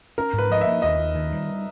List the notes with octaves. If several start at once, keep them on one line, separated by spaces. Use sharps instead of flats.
C#4 A#4
G#2
B4
F3 D#5
E5
A#3
D#2 D#5
D#2
D#3
G3